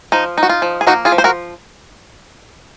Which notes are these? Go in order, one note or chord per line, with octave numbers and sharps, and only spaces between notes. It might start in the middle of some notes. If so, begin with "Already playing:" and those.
F3 D#4
D#4
F#4
F4
F3
G#4
A#3 D#4 F#4
F4 G#4
F3
C5
F#4 A#4